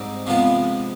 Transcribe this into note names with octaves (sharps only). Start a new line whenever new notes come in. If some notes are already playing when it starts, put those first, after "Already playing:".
Already playing: G#2 G3 C4 D#4
C3 F3 G#3 B3 F4